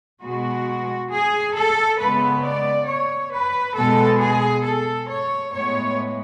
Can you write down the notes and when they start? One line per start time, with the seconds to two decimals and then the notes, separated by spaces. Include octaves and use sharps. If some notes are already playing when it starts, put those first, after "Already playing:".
0.22 B2 G#3 B3 F#4
1.10 G#4
1.55 A4
1.99 C#3 G#3 B3 B4
2.44 D5
2.88 C#5
3.32 B4
3.76 B2 G#3 B3 A4
4.20 G#4
4.64 A4
5.09 C#5
5.52 A2 G#3 B3 C#5